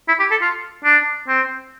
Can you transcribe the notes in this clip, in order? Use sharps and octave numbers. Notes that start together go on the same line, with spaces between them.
E4
G4
A4
F4
D4
C4